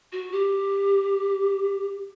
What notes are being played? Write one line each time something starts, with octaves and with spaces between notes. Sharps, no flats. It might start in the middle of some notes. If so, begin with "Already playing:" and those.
F#4
G4